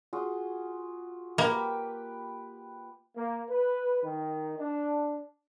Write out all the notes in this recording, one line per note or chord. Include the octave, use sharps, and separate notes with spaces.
F4 F#4 G#4
A#3 G4 B4 G5
A#3
B4
D#3
D4